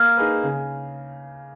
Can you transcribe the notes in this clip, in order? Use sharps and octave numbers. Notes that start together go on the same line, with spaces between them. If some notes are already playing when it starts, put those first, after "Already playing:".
Already playing: A#3 F6 G#6
D#4 G#4 B4
C#3